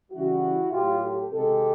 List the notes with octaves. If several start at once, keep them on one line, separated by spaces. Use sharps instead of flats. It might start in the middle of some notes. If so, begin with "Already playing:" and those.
C#3 E3 G3 E4 F#4
A2 F#3 F4 G4
G4 A4
C3 D#3 G#3 G4 A4